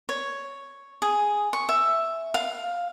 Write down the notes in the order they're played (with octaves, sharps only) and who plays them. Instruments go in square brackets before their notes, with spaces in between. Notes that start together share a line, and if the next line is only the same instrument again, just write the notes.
[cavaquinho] C#5
G#4
C#6
E5
F5